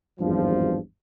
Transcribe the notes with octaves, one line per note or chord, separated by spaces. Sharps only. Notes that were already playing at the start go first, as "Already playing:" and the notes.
G#1 E2 G2 F3